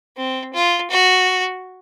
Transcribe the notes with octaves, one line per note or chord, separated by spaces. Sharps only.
C4
F4
F#4